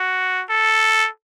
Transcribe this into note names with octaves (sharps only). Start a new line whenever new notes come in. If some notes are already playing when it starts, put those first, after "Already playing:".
Already playing: F#4
A4